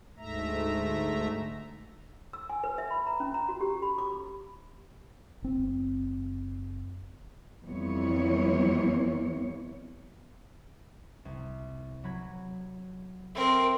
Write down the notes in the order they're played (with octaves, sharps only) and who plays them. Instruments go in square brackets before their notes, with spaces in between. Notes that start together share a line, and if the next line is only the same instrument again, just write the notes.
[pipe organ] D2 G#2 A3 E5 A#5
[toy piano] E6
G#5
B4
E5
B5
A#5
C#4
A#5
F#4
G4
B5
D6
[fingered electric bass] F#1 C4
[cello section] F2 E3 G3 B3 C#5
[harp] C2
F#3 B5 G#6
[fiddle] C4 A#4 [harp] A4 E5 B5